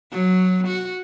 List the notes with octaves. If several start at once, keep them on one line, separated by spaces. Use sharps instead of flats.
F#3
F#4